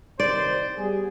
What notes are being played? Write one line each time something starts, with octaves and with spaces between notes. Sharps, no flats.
C2 D#3 C5 D5
G3 B3 G#4